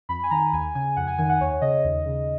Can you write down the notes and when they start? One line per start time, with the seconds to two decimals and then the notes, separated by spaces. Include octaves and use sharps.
0.09 F2 B5
0.23 G#5
0.31 D#3 A#5
0.53 D#2 G#5
0.75 C#3 G#5
0.96 F2 F#5
1.07 G#5
1.18 D#3 G#5
1.29 F#5
1.40 D#2 C#5
1.62 C#3 D#5
1.84 D#2
2.06 C#3